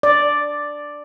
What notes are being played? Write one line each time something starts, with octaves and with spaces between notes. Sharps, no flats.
D5